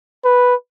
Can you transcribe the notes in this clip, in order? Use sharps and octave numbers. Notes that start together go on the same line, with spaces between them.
B4